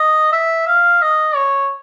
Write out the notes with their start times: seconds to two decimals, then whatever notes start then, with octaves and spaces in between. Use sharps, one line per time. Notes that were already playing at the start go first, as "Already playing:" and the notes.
Already playing: D#5
0.32 E5
0.67 F5
1.02 D#5
1.36 C#5